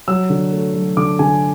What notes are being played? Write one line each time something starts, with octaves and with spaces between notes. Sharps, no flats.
F#3 E6
D3
A3
F#3
D3 D6
D3 G#5